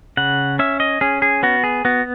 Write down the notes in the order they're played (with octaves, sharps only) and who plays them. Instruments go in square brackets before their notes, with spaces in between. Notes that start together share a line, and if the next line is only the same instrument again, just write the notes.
[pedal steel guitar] C#3 F#5
C#4 E5
D#5
C#4 G#4
G#4
B3 F#4
G#4
B3 F#4